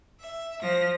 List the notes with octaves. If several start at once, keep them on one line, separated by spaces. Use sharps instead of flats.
E5
F3 A#6